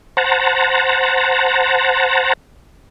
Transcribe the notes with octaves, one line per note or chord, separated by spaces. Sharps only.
C5 F#5 A5 A#5